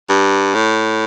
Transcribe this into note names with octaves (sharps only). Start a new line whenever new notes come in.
G2
A2